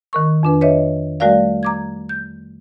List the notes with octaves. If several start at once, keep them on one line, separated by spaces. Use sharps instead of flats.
D#3 A#4 C#6
F2 D4 B4
B4 C#5 D#5 E5
G3 A3 F#4 A#4 D5 F5
A#5 D6 G#6
G6